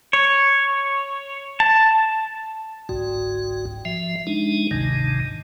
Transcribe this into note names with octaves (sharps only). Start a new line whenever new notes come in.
C#5
A5
G1 C2 G#2 F#4
F3 E5
G#3 D4 D#4
G#1 D2 G#2 C3 D#3